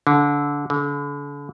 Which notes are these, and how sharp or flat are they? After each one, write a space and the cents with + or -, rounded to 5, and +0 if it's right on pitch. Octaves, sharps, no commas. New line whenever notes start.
D3 -20
D3 -40